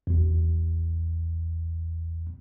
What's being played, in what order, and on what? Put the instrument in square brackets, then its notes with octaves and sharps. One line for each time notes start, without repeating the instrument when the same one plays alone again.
[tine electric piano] G#1 E2